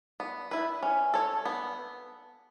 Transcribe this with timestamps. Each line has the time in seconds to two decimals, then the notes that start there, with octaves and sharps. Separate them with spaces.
0.20 B3
0.51 E4 B4
0.82 C#4
1.14 A4 C#5
1.45 B3